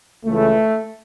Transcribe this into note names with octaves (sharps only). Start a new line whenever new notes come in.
C#2 C#3 E3 A3